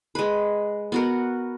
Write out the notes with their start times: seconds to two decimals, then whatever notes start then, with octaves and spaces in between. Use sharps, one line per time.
0.15 G#3 B4
0.92 B3 F#4 A#4